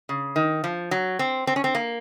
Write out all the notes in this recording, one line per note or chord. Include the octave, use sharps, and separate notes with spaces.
C#3
D#3
F3
F#3
C4
C4
C#4
C4
A#3